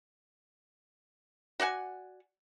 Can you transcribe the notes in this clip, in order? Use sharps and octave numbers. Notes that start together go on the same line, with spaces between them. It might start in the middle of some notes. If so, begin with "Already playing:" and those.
F#4 D5 F#5 G#5